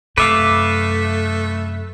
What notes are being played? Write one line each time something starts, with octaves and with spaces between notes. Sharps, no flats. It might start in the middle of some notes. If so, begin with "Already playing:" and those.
F#2 C3 A3 B4 E5 F5 D6